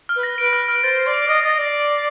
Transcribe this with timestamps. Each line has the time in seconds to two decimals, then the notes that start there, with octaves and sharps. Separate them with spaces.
0.09 F6
0.16 B4
0.23 A#6
0.38 B4 D7
0.53 F6
0.68 F6
0.84 C5 A6
0.99 C7
1.07 D5
1.14 F7
1.28 D#5 F6
1.43 D#5 A6
1.58 D5 C7